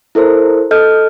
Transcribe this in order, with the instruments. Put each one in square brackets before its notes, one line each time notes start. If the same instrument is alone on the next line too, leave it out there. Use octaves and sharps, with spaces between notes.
[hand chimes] E4 A4 A#4 C5
A4 D#5 F6 G6